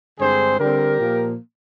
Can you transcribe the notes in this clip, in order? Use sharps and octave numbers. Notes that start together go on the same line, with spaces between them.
G2 D3 G#3 C4 G#4 C5
D3 G3 C4 G4 A#4
A#2 F3 A#3